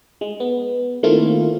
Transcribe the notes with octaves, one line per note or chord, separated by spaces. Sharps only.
G#3
B3
D#3 A3 A#3 C4 E4 F4